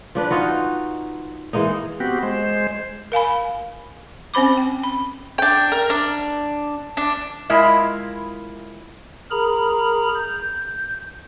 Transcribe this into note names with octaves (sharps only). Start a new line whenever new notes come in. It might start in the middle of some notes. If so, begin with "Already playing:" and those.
F3 D4 B4
D#4 F4 F#4
E3 G#3 A#3 D#4
B3 C4 F#4 G4
G#3 C5
A#4 F5 G#5 B5
C4 C#4 C5 B5 D6
G5
B5
D4 G5
A#4
D4
D4
G#3 E4 F4 A#4 E5
G#4 A#4 A#5 B5
G6